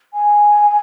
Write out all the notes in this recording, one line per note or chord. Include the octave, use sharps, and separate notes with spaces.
G#5